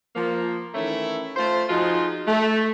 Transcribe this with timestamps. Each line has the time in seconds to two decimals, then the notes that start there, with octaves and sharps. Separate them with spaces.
0.16 F3 A#3
0.74 D#3 E3 A3 C#4 E4
1.36 A3 F4 C5
1.69 F3 D#4 F4 F#4 G#4
2.27 A3